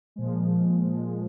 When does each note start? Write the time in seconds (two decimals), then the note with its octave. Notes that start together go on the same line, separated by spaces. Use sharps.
0.16 A#2 F3 G#3
0.85 A#2 F3 G#3